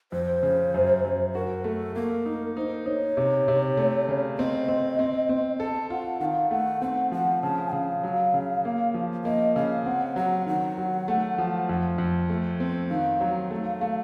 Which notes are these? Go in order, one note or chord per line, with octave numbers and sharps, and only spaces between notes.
F2 C5
C#3
F#2
F#2
F#4 A#4
A3 A4
A#3 A#4
D#4
D#4 C5
D#4 C#5
C3
C3
A3
C#3
C4 D#5
C4
C4
C4
A4 A5
F4 F#5
D#3 F5 F#5
A3 F#5
C4 F#5
F3 F#5
C#3 A5
C#3 F5
F#3
C#3
A#3
F3
A#3 D#5
C#3 F5
C4 F#5
F#3 F#5
D#3 F#5
F#3
A3
F3
F2
F2
A3
C4
D#3 F5
F#3
A3
A3